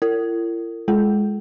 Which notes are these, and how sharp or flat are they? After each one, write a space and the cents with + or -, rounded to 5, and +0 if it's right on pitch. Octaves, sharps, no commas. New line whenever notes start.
E4 +45 A#4 -40
G#3 +0 A4 -45